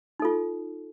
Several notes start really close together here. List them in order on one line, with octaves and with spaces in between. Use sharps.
D#4 A4 F4